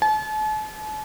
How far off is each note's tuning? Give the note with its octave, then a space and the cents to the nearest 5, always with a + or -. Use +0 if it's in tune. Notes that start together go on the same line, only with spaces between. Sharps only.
A5 -45